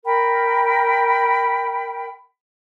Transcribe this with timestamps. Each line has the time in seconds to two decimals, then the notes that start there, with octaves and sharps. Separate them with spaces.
0.05 A#4 G5 B5